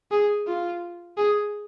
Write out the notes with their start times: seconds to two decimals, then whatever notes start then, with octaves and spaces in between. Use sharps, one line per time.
0.11 G#4
0.47 F4
1.17 G#4